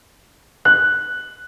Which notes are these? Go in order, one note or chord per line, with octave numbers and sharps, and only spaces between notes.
F#6